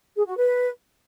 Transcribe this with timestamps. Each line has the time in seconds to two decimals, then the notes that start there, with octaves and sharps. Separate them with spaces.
0.17 G#4
0.27 F#4
0.37 B4